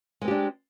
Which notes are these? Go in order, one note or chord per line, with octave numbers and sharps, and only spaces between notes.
G#3 C4 D4 G4